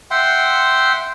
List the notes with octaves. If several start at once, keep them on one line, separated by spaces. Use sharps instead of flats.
E5 F#5 G5 C6